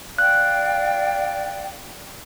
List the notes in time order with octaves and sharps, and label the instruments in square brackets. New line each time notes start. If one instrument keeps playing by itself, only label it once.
[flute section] D5 F5 G5 [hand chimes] F#6